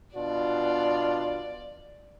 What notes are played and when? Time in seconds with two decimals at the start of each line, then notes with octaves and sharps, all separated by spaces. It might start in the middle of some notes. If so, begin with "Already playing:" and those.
0.16 B2 D4 F4 D5